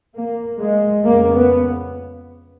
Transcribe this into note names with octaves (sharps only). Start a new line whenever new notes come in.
A#3
G#3
F2 C#3 A#3
B3